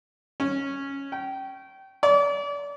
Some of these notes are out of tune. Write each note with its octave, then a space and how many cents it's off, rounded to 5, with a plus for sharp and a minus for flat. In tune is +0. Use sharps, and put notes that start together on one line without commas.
C#4 -5
G5 -25
D5 -35